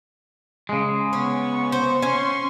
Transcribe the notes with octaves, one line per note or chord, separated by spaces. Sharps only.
C#3 G#3
B3 C#4 C#6
C5
C#4 C6 C#6